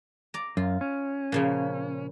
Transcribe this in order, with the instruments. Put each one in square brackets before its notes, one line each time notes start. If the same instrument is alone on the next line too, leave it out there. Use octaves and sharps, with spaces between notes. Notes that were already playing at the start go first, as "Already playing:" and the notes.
[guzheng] D5 A#5
[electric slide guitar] F#2 [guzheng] F4
[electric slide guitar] C#4
[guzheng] A#2 C#3 F3